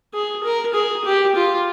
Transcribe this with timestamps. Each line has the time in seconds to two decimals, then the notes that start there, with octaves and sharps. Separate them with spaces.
0.14 G#4
0.44 A#4
0.74 G#4
1.04 G4
1.35 F4